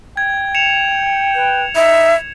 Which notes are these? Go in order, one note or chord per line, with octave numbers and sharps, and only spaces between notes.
G5 G#6
C#7 E7 F7
B4
D#4 E5